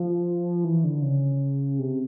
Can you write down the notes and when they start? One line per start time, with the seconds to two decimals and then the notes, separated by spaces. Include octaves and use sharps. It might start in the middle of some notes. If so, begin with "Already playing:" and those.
Already playing: F3
0.64 E3
0.84 D3
1.02 C#3
1.79 C3